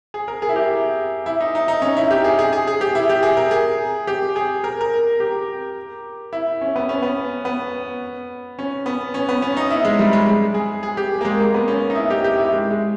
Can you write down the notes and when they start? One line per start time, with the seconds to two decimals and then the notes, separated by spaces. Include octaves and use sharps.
0.14 G#4
0.28 A#4
0.42 G#4
0.49 E4
0.56 G4
1.26 E4
1.41 D#4
1.55 D#4
1.68 D#4
1.82 C#4
1.97 E4
2.11 G4
2.24 G#4
2.39 G#4
2.53 G#4
2.67 G#4
2.81 G4
2.95 E4
3.09 G4
3.23 G#4
3.37 A#4
3.51 G#4
4.07 G4
4.36 G#4
4.64 A#4
4.81 A#4
5.20 G4
6.33 E4
6.61 C#4
6.76 B3
6.89 C#4
7.03 B3
7.45 B3
8.59 C#4
8.86 B3
9.14 C#4
9.29 B3
9.42 C#4
9.57 D#4
9.71 E4
9.85 G#3
9.99 G3
10.13 G#3
10.54 G#4
10.83 G#4
10.97 G4
11.21 A#3
11.25 G#3
11.40 A#3
11.54 B3
11.68 C#4
11.90 D#4
11.95 E4
12.10 G4
12.24 G4
12.38 E4
12.52 G#3
12.71 G#3